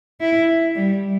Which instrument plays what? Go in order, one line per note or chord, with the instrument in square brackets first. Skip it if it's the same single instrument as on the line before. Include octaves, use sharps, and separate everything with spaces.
[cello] E4
G3